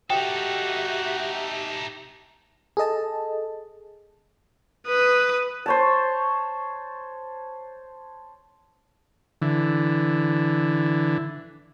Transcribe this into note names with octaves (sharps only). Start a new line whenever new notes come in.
D#4 F#4 G4 A4 E5 G5
G#4 A4 D#5 A5
B4 D#6
C5 C#5 A5
D3 E3